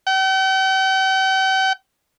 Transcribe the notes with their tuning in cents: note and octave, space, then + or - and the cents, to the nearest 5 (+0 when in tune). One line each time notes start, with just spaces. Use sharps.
G5 -45